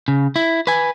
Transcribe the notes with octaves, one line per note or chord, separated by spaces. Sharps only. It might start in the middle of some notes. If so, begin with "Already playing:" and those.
C#3
E4
B4 G#5